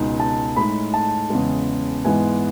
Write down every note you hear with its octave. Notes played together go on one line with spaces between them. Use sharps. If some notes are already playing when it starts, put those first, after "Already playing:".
Already playing: C#2 B2 G#3 D#4
A5
A2 G#3 D#4 B5
A5
E2 C#3 G#3
G#2 E3 G#3 B3 G#5